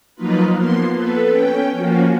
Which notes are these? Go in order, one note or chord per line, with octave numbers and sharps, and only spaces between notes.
F3 F#3 A#3 D#4 F4 B4
F3 A#3 B3 C6
B3 A4 B4
C#4 G5
F3 A#3 C#4 F4 F#4